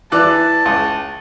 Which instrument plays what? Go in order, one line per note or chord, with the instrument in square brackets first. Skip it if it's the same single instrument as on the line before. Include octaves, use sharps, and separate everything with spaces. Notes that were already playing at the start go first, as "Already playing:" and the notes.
[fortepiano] E3 D5 F#6 [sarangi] A5
[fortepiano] C#2